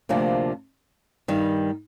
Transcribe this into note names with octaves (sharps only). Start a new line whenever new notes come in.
D2 C3 F3 A#3 D4
G2 D#3 G3